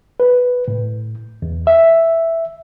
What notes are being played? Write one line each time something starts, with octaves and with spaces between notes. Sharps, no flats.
B4
A2
E2
E5